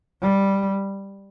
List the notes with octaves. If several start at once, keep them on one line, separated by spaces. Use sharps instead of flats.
G3